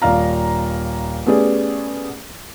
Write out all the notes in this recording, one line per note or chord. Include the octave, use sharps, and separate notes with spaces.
D#1 D5 F5 A#5
A3 B3 C#4 G4 G#4 D5